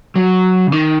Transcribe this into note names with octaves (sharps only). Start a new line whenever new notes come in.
F#3
C#3
D#3